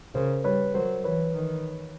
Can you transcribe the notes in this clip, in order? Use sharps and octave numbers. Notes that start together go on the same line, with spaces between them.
C#3 A#4 C5
G3 B4 C#5
F#3 A#4 C5
E3 B4 C#5
D#3